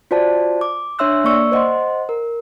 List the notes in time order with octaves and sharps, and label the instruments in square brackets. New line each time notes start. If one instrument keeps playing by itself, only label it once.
[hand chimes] F4 F#4 C5 D5 A5
D6
D4 C#5 E5 C6 E6 F#6
A#3 D5 C#6 E6
C5 D#5 F#5 C6
A#4